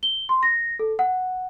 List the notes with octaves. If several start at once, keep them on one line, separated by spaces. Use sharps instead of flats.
G7
C6
A#6
A4
F#5